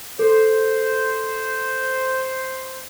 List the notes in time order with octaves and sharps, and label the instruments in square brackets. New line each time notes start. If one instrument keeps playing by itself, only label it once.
[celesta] A4 [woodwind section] C5